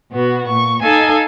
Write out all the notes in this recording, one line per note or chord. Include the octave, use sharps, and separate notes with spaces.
B2 B3 F#4
A#2 C#6
D#4 A4 F5 G#5